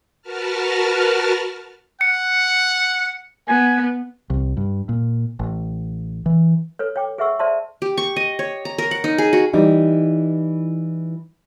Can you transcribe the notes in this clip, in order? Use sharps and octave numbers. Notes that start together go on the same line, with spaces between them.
F#4 A#4 B4 A5 F6
F#5 C#7
B3 G#5
C2
G2
A#2
A1
E3
A4 B4 C#5
C#5 G5 D6
G#4 B4 E5 F#5 C#6 E6
C5 D5 E5 A5 C6
G4
C#6
D#5
C#5
A#5
A#4
F#5
D#4
G#4
F#4
E3 G3 D#4